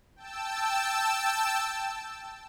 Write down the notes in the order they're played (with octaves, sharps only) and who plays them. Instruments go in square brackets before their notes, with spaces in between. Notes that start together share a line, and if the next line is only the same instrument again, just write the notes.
[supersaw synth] G5 A5 E6